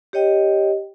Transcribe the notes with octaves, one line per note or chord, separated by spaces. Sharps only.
G4 C#5 D#5 G5